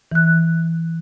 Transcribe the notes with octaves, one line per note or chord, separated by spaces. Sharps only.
E3 F#6